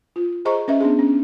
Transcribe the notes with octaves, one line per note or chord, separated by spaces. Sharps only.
F4
G#4 C5 D#5 A#5 C#6
C#4 B4 D#5 E5
B3 D4 G#4
C#4